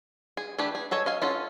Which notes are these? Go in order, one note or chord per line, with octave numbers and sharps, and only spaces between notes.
G#4
E3 A3 D4 G4 B4
G#4
G#4 A4 C#5 D#5
D#5 F5 G#5
C#4 F4 A4 F#5